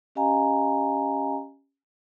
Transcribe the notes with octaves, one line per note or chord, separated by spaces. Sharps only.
C#4 G4 D#5 F5 G#5 A#5